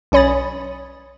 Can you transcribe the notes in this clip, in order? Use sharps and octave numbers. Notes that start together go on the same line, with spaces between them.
B1 C#4 C#5 B5 D#6 A6